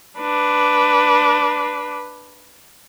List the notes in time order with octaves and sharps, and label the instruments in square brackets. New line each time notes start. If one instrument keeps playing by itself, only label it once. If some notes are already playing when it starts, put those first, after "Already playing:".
[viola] D4 B4